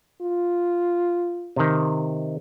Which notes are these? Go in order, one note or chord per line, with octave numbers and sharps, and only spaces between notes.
F4
C3 D#3